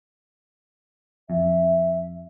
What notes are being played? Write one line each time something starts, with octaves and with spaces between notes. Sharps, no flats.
F2 E5